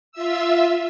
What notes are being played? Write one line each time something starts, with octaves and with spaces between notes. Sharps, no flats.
F4 E5 E6